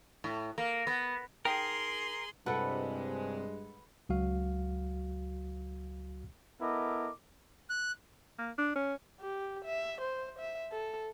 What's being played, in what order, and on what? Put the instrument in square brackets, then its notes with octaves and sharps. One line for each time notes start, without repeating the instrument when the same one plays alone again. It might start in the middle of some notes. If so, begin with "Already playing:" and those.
[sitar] A2
A#3
B3
[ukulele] D#4 G5 A5 [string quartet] G#4 C6 [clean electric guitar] A#4
[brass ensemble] G2 G#3 [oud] C3 E4 [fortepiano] A4 B4 F#5
[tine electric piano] C#2 F#3 F#4 F5
[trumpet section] B3 E4 A4 A#4 D#5 D6
[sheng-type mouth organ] F#6
[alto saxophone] A#3
D4
C#4
[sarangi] G4
E5
C5
E5
A4